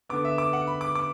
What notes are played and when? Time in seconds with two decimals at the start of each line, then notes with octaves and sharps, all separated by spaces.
0.09 D3 B3 D6
0.25 E5
0.38 D6
0.53 F#5
0.67 B5
0.81 D6
0.95 D6